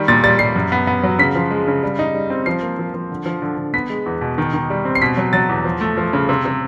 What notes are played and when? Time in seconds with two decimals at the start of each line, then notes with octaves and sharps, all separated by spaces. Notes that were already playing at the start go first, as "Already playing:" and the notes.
Already playing: D#3 G3
0.08 A#2 A6
0.24 G3 A6
0.39 G3 C7
0.56 F#2
0.72 B3
0.87 B3
1.03 F#3
1.19 C#3 B6
1.35 F3
1.51 G#3
1.68 C#3
1.83 G3
1.99 D#4
2.15 G3
2.30 C4
2.46 F3 C7
2.63 A#3
2.79 F3
2.94 F3
3.11 D3
3.26 F3
3.42 D3
3.58 D3
3.74 B3 B6
3.90 G#3
4.06 E2
4.21 B2
4.38 D#3
4.53 D#3
4.70 G3
4.85 C4
4.95 C7
5.02 B2 B6
5.17 F#3
5.33 F#3 A6
5.49 E2
5.65 F3
5.81 A3
5.97 F3
6.13 C#3
6.29 C3
6.45 C3